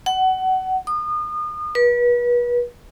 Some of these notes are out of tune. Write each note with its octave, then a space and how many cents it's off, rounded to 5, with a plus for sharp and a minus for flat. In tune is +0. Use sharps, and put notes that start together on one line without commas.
F#5 +25
D#6 -35
B4 -35